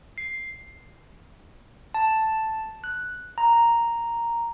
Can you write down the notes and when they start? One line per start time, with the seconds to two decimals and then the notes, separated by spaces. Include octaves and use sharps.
0.18 C7
1.94 A5
2.84 F#6
3.38 A#5